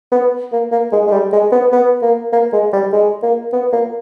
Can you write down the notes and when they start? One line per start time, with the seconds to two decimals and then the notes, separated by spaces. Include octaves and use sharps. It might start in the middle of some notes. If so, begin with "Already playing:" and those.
0.12 B3
0.52 A#3
0.72 A#3
0.92 G#3
1.07 G#3
1.12 G3
1.33 G#3
1.52 B3
1.72 B3
2.02 A#3
2.33 A#3
2.53 G#3
2.73 G3
2.93 G#3
3.23 A#3
3.53 B3
3.73 A#3